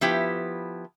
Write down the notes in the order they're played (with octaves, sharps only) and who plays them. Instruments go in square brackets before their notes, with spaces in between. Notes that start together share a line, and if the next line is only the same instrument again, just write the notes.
[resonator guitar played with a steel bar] F3 B3 E4 G4